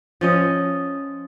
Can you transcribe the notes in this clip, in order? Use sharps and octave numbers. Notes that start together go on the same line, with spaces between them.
F3 C#4 D#5